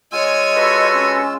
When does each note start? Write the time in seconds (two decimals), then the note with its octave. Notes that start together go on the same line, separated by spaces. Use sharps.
0.12 G#3 F4 C#5 D#5 G#5 E6
0.56 F#4 A4 B4
0.93 C#4